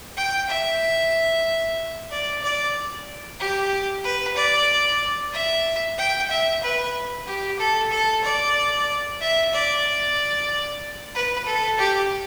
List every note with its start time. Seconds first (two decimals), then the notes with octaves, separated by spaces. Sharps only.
0.17 G5
0.49 E5
2.11 D5
2.43 D5
3.40 G4
4.04 B4
4.36 D5
5.33 E5
5.98 G5
6.30 E5
6.63 B4
7.27 G4
7.59 A4
7.91 A4
8.24 D5
9.21 E5
9.53 D5
11.15 B4
11.46 A4
11.78 G4